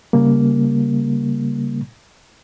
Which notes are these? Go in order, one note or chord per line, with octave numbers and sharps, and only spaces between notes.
C#3 G3 A#3